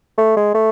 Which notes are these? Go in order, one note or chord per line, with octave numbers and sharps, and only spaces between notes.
A3
G#3
A3